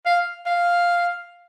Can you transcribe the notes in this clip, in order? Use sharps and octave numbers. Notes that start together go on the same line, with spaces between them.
F5
F5